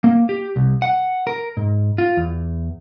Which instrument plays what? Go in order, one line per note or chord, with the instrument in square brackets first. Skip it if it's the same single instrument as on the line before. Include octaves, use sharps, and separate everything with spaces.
[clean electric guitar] A#3
G4
C2
F#5
A#4
G#2
F4
E2